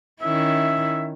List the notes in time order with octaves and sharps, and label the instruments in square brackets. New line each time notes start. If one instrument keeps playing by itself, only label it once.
[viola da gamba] D#3 C#4 E4 [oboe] E5